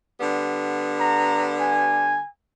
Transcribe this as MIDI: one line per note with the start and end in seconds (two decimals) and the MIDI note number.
0.21 2.19 50
0.21 2.19 55
0.21 2.19 59
1.00 1.45 82
1.60 2.27 80